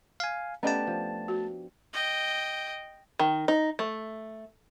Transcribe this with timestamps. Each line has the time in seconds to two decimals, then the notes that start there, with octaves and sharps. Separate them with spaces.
0.20 F5 G#5
0.63 A3 B3 C#4 D4 G4 D#5 A5
0.87 F3
1.28 F#4
1.93 D#5 G5
3.20 D#3
3.48 D#4
3.79 A3